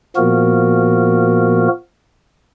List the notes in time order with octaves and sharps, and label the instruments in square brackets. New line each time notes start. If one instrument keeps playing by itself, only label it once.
[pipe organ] A#2 F3 A#3 B3 F#4 A#4